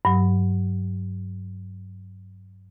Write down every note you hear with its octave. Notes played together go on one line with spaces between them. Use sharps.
G2 F#3